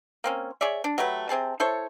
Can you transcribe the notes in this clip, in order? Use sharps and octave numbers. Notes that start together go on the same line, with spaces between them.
A#3 C4 C#4
G#4 C#5 D5 E5
D4
F#3 A3 G4 B4
C3 C4 G#4 A5
E4 A4 C5 C#5